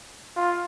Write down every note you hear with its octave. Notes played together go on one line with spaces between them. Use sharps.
F4